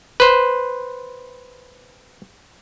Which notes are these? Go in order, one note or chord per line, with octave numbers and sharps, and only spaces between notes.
B4 C5